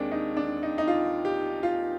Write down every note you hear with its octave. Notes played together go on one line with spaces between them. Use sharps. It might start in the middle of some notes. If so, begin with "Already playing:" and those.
Already playing: D#2 D#3 G#3 C4 D4 G#4
D#4
D4
D#4
D#4
F4
G4
F4